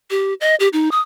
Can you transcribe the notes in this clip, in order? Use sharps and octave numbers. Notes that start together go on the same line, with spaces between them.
G4
D#5
G4
D#4
D#6